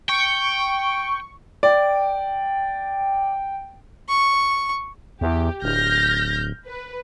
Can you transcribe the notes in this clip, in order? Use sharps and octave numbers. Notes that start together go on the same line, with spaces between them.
G5 C#6
D5 G5
C#6
E2 G4
D1 F6 G6 A#6
B4